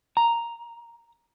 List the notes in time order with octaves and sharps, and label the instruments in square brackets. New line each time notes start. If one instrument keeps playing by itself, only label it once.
[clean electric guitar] A#5